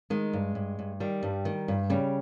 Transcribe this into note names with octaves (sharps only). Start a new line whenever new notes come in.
D#3 G#3
G2
G2
G2
D#3 G3
G2
D#3
G2
C#3 G3